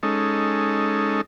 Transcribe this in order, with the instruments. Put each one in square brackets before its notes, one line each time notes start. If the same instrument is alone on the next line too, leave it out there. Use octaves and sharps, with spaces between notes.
[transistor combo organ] G#3 C#4 D#4 A4